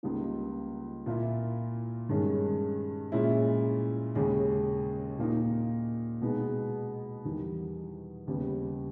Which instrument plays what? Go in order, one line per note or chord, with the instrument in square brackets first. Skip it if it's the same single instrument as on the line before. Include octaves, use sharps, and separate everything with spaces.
[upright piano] C#2 C#3 G3 A#3 D#4
A#2 A#3 E4
G2 D#3 G#3 C#4
A#2 G#3 C#4 E4
D#2 C#3 G#3 C#4
A#2 A#3 D#4
B2 G#3 B3 D#4
E2 D#3 G3
D#2 C#3 G3 B3